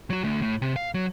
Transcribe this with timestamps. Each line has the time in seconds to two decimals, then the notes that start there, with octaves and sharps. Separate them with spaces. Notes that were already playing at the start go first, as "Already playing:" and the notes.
0.10 F#3 F#4
0.24 D2 A3
0.42 A2
0.62 C3
0.76 F5
0.94 F#3